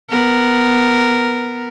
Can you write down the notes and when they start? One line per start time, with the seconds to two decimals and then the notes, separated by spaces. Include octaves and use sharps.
0.10 B3 A#4